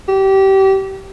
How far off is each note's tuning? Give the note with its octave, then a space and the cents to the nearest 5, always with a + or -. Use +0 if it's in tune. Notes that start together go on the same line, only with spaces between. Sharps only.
G4 -25